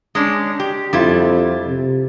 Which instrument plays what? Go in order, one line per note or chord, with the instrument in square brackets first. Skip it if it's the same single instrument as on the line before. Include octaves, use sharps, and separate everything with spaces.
[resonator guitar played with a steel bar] G#3 C#4 D4
G4
[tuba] F2 [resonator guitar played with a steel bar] G3 E4 F4
[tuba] C3